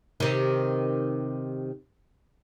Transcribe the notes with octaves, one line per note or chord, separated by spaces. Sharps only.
C3 D#3